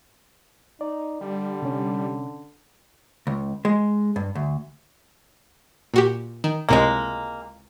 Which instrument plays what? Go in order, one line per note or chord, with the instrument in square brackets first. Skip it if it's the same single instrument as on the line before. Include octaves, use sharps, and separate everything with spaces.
[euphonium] D#4 [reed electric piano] D5
[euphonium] D3 [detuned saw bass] G3
[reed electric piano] C3 C#4
[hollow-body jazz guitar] C#2
G#3
G2
D2
[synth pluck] A#2 F#4 G4
D#3
[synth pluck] C#2 A2 C3 [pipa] G#3 A#3